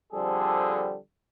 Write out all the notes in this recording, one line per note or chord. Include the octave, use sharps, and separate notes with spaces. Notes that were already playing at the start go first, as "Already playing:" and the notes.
D3 F3 G3 C4 G#4 A4